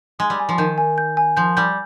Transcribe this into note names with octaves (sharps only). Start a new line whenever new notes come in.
G#3 D#6
G3
G#5
F3
D#3 G6
G#5
G6
G#5
F3 G6
G3 G6